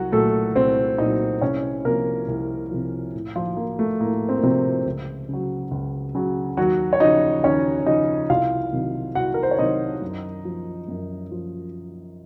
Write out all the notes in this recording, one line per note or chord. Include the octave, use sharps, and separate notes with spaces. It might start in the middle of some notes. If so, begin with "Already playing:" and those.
Already playing: C2 F#3 F#4
A#2 F#3 A3 A4
C2 C4 C5
A#2 F#3 D#4 D#5
C2 C#4 C#5
C3 F3 A#3 A#4
C2
C3 F3
A2
F3 F4
F3 A#3
A3
A2 A#3
C4
A#3
C3 F3 C4
C#2
C#3 F#3
C#2
C#3 F#3
D#2 F#3 F#4
C#5
C#3 F3 D#4 D#5
D#2 C#4 C#5
C#3 F3 D#4 D#5
C2 F4 F5
C3 D#3 F#3
C2 F#4 F#5
A#4
C5
C#5
C3 D#3 F#3 D#4 D#5
F#2
F3
F#2
F3